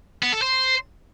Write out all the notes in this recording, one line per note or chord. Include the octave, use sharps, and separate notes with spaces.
B3
A4
C5